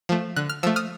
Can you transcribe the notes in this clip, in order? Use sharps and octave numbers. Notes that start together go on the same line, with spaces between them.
F3 A3
D3 F#6
F6
F3 A3 E6
D#6 F6